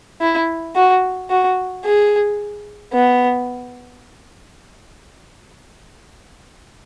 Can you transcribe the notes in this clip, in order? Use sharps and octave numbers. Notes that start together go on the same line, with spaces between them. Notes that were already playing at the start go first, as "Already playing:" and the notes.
E4
F#4
F#4
G#4
B3